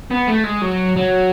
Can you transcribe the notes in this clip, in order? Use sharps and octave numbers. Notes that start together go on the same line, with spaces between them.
B3
A3
G#3
F#3
F#3